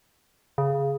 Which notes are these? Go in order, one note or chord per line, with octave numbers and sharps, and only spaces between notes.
C#3